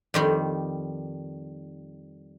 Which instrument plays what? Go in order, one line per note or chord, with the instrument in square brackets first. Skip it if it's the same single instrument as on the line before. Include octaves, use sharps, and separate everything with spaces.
[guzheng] F2 D#3 G3